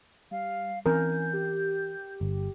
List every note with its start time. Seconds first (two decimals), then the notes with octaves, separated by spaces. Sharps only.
0.31 G3 F5
0.86 E3 C4 C#4 A#4 G#5 G6
1.33 G4
2.21 G1